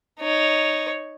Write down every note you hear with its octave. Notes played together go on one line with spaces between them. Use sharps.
D#4 C#5